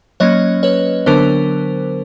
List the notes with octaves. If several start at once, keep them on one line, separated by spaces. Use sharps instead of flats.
F#3 A#3 C#4 C#5 D#5
B4 C#5
D3 F#3 B3 D4 A#4 C5